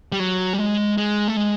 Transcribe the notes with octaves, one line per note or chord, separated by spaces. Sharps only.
G3
F#3
G3
G#3
G#3
A3
G#3